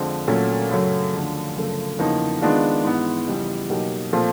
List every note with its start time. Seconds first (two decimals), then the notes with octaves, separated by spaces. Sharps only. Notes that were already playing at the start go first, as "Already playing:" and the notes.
Already playing: F2 D3 F3 G#3 C4
0.28 A#2 F#3 A3 C#4
0.70 F#2 C#3 F#3 A3
1.13 D2 D3 F3
1.56 F#2 C#3 F3 A3
1.99 E2 C#3 F3 A#3 D#4
2.42 D#3 G#3 B3 D4 F4
2.84 G#2 E3 G#3 B3
3.27 F2 C#3 E3 G3 B3
3.70 B2 F#3 A#3 D#4 G4
4.13 A#2 F3 A3 C4 F4